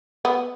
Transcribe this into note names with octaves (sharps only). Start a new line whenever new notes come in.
B3